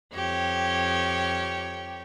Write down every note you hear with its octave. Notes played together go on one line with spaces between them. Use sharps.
F2 G4 C#5